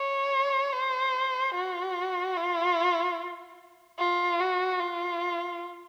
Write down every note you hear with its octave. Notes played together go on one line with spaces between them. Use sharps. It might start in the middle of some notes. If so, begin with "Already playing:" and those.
Already playing: C#5
C5
F#4
F4
F4
F#4
F4